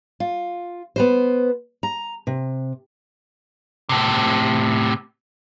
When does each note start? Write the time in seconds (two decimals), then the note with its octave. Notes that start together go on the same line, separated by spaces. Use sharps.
0.20 F4
0.96 B3 B4 C5
1.83 A#5
2.27 C3
3.89 A2 C3